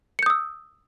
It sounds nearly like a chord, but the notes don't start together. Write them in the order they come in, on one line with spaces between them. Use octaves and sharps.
C#7 G6 D#6 E6